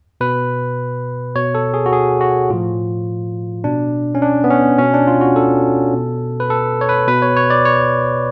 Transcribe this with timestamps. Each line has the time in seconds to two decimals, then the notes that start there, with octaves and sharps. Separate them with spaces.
0.21 B2 B4
1.35 B2 C#5
1.55 A4
1.74 G#4
1.86 F#4
1.93 G#4
2.21 F#4
2.50 A2 F3 F4
3.64 B2 D4
4.15 C#4
4.22 D4
4.44 B3
4.50 C#4
4.78 B2 C#4
4.94 D4
5.07 F4
5.21 F#4
5.36 A4
5.93 B2
6.40 B4
6.50 A4
6.81 C#5
6.89 B4
7.08 B2 B4
7.22 C#5
7.36 C#5
7.50 D5
7.65 C#5